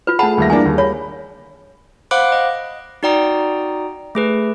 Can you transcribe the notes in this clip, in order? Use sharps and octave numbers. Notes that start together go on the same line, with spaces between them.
F4 B4
A3 G#4 F#5 A5 B5
D#2 G3 E5 A#6
E3 A#3 D4 G#5
D#2
C#5 B5
C5 F5 F#5 B5 D6 F#6
D#5
D#4 F#4 D5 G5 A#5 D#6
A3 G#4 B4